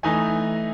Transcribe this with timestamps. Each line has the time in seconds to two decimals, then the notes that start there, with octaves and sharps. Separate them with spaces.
0.03 E3 A3 D#4 G#5